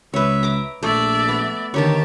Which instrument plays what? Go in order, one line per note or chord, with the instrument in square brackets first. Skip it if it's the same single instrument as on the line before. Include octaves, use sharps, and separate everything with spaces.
[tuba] C#2 [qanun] B4 C#5 [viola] E5
[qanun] A#5 D6
[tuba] A#1 [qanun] A3 [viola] D5 E5
[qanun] B3
[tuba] D3 [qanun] D#3 A#3 C#5 [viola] G4 A5